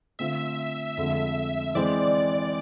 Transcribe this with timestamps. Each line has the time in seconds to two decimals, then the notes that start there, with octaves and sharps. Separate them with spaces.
0.19 D3 A3 C4 F4 E5
0.97 F2 D3 F3 G#3 E5
1.75 E3 G#3 C4 D5